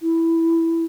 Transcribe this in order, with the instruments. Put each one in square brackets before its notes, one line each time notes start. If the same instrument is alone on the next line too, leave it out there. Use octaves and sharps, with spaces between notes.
[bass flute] E4